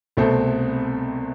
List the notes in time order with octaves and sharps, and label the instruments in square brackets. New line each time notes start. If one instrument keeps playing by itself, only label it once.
[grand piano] C2 B2 A3 C4